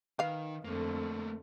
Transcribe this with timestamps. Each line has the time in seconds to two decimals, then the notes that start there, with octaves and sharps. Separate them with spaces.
0.19 D#3 B4 F5
0.65 F2 D3 A3 A#3